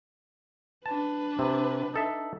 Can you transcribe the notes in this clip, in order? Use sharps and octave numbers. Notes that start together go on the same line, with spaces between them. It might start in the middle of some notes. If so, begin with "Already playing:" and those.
D4 B4 A5
C3
D#4 A4 E5